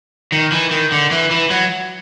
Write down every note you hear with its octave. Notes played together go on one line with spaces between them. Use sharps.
D#3
E3
D#3
D3
E3
E3
F#3